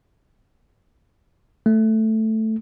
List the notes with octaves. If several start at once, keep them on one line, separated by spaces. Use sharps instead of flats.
A3